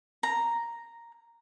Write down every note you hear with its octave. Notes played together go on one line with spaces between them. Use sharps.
A#5